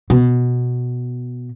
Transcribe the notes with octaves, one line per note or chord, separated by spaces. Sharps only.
B2